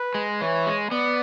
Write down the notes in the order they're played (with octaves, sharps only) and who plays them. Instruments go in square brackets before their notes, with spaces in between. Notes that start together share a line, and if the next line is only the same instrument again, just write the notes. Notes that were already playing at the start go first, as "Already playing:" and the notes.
Already playing: [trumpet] B4
[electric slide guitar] G#3
[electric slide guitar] E3 [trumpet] C#5
[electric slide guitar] G#3
[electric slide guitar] B3 [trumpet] D5